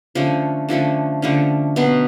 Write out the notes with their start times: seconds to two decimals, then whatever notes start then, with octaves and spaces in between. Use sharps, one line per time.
0.15 D3 F3 A3 C#4
0.69 D3 F3 A3 C#4
1.22 D3 F3 A3 C#4
1.76 B2 F#3 B3